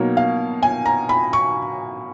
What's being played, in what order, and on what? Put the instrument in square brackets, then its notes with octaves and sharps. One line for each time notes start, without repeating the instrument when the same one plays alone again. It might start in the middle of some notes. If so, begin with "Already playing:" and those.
Already playing: [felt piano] B2 F#3 A#3 D#4 C#5
F5
G#5
A#5
B5
C#6